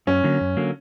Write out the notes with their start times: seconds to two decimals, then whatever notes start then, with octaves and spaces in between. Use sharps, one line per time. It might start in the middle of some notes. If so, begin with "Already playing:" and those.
0.07 F#2 C#4
0.24 D3 F#3 A#3
0.41 F#2
0.57 D3 F#3 A#3